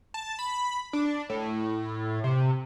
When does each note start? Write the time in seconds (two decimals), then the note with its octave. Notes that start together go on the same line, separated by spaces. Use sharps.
0.14 A5
0.39 B5
0.93 D4
1.29 A2
2.24 C3